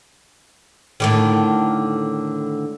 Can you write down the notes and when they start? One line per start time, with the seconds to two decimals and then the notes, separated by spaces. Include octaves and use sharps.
1.00 A2 D3 D#3